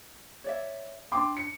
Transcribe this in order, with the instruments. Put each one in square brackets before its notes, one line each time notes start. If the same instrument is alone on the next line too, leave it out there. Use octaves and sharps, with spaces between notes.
[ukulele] C#5 D5 E5
[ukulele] C#4 D4 [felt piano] G5 C6 D6
[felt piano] C#7